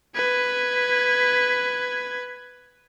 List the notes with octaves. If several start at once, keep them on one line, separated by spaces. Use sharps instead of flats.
B4 G#6